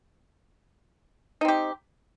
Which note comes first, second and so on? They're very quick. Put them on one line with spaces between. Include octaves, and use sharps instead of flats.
D#4 C4 G4